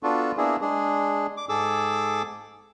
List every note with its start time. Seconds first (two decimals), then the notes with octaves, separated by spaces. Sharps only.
0.03 B3 D4 F4 F#4 A4
0.37 A#3 B3 D4 E4 G#4
0.61 G#3 D4 G#4
1.37 D6
1.49 G#2 G#4 A4 D6 E6